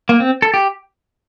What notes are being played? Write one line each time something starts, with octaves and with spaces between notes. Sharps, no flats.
A#3
C4
A4
G4